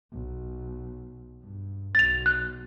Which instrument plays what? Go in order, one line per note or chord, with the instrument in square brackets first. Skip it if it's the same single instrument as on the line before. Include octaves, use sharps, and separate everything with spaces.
[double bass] B1
G2
[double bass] B1 [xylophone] A6 F7
[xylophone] F#6